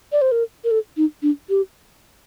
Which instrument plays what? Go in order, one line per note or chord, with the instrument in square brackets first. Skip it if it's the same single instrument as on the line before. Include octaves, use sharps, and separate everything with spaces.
[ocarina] D5
C5
A#4
A#4
A4
D#4
D4
G4